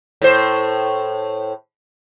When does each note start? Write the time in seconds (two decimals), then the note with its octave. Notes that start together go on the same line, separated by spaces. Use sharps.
0.22 A2 C5